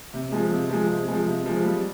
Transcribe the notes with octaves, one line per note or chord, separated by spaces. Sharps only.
C3
F3 G#3
C3
F3 G#3
C3
F3 G#3
C3
F3 G#3
G3